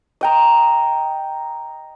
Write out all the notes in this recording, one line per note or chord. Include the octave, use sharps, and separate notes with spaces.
D#5 G5 A#5